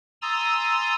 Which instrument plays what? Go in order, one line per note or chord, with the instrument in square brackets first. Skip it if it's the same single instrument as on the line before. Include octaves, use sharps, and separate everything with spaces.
[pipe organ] G#5 A#5 C6 D#6 E6 A6